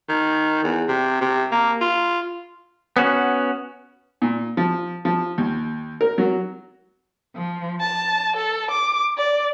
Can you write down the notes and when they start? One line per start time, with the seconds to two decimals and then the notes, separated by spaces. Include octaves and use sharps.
0.09 D#3
0.64 E2
0.89 C3
1.21 C3
1.52 A#3
1.81 F4
2.97 B3 C#4 F#4
4.22 A#2
4.57 F3
5.05 F3
5.38 D#2
6.01 A#4
6.18 F#3
7.34 F3
7.80 A5
8.34 A4
8.69 D6
9.15 D5